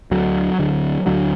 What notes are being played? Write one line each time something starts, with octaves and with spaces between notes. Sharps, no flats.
D2 D3 F#3
D2 D3
D2 D3 F#3